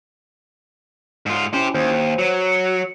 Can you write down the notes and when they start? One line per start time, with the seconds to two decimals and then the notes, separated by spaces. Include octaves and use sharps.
1.26 G#2 F4
1.54 C#4 E4 G4 C5
1.75 D#2 C5
2.19 F#3
2.52 C#7